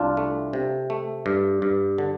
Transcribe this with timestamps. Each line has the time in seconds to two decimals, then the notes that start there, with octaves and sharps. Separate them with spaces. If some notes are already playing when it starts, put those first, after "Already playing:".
Already playing: C2 D4 F4
0.17 A3
0.53 C3
0.90 A3
1.26 G2
1.62 G2
1.98 D3